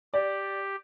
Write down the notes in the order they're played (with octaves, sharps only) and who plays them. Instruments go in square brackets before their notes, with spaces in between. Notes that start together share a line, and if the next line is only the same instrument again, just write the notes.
[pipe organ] G4 [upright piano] D5